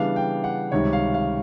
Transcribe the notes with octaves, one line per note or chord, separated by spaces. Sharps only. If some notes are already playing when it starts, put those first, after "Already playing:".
Already playing: C#3 E3 G3 B3 D4 F5
G5
F#5
C#2 C3 D#3 G3 C#5
F5
F5